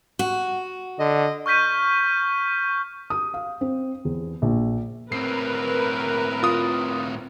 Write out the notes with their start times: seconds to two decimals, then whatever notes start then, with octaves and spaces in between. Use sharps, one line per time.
0.19 F#4
0.99 D3 D#5
1.46 C#6 F6 G6 B6 D#7
3.10 D#6
3.34 F5
3.61 C4
4.05 E2
4.42 A#1
5.12 A2 C4 A#4 B4 C7
6.43 F4 D#6